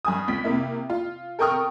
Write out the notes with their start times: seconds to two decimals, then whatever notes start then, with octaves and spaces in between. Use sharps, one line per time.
0.05 G2 G#5 D#6
0.28 C#2 B6
0.44 C3 A#3 E4
0.90 F4
1.39 A4 A#4 G5 C#6 D#6 F6